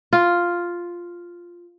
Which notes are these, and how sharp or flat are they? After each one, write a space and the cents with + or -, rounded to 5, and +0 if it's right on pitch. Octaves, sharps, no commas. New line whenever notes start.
F4 +0